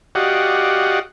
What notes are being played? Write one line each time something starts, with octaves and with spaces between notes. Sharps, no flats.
F#4 G4 D5 D#5 F5 F#5